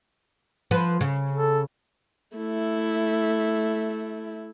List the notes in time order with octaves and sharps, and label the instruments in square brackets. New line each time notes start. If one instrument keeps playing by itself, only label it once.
[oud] F3 B4
C#3
[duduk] A4
[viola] A3 E4